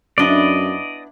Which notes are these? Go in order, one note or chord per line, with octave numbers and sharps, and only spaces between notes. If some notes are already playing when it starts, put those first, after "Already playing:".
F#2 B3 D4 E4 D5 D#5